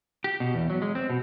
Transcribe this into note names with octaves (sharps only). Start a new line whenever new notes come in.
G4
B2
E2
F#3
G#3
C4
B2